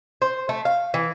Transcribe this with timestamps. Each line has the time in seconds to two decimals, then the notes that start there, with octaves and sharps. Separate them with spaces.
0.22 C5
0.49 A3
0.65 F5
0.94 E3